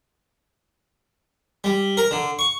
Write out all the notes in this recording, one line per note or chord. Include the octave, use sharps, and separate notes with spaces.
G3
A#4
D3
C#6